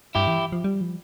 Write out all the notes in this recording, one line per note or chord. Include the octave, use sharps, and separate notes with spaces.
G2 E4 G4
E3
F3
G3
F3